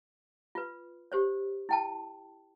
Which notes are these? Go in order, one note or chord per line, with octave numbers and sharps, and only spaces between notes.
F4 B4
G4 C5 C#5
E4 G5 A5